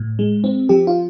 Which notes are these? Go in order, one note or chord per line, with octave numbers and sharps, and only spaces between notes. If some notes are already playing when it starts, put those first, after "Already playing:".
Already playing: A2
G#3
C4
F3 G4
F4